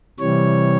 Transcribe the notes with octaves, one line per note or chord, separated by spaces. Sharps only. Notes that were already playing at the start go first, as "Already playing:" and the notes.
C3 E3 G3 C#5